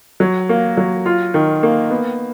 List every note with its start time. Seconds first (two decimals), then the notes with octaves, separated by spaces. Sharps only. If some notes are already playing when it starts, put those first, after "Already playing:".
0.20 F#3
0.49 A#3
0.77 F#3
1.06 F4
1.34 D#3
1.63 A#3
1.90 B3